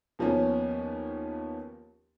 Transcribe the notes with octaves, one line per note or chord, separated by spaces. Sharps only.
D#2 F3 B3 C#4